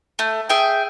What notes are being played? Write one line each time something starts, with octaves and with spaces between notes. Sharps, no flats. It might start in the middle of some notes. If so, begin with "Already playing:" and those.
A3
G#4 E5 G5